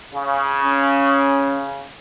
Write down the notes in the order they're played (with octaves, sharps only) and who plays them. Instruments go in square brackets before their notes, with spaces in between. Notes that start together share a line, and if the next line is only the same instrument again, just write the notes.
[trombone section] C#3
[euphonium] C#4